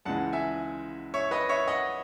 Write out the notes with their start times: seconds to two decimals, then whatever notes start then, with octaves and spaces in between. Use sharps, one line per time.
0.05 C#2 C#3 E3 G#3 F#5 A5
0.33 E5 G#5
1.14 C#5 E5
1.31 B4 D#5
1.49 C#5 E5
1.68 D#5 F#5